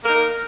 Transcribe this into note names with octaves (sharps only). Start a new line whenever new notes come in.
A#3 D#4 A#4